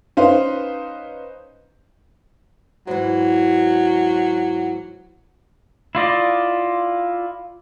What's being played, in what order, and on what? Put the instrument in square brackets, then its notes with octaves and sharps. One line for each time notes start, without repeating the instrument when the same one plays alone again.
[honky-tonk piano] C#4 D#4 B4 C5 F5
[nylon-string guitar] G#2 E3 [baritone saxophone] F#3
[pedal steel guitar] E4 F4 D5 D#5